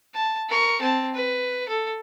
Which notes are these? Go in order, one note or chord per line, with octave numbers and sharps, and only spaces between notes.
A5
A#4 C#6
C4 A5
B4
A4